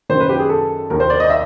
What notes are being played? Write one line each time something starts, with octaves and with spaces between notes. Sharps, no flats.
F#2 D#3 C5
B4
G4
G#4
A4
D#2 D#3 A#4
C5
D5
D#5
E5